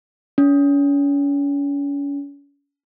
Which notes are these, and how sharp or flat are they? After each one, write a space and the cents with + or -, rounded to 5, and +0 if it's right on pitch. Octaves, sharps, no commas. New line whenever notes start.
C#4 +35